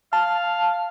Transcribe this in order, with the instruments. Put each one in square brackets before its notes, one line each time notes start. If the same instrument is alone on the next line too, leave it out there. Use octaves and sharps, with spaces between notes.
[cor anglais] F5 [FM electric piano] A5